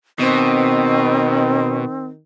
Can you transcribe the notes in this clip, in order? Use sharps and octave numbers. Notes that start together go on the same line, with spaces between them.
B2 D#3 C4